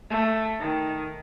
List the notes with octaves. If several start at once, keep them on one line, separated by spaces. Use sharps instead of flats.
A3
D#3